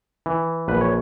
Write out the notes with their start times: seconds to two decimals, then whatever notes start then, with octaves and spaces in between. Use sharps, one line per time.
0.26 E3
0.68 A#1 B4
0.81 C#5